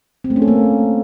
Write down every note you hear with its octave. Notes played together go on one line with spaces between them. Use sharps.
C4
A3
C#4
A4
A#3